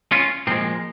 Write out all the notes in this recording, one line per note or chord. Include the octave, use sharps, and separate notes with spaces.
C#4 F4
A#2 F3 G#3 C4